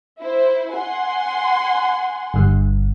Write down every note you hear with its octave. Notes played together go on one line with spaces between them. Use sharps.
E4 C5
F#5 G#5 C6
G1 G2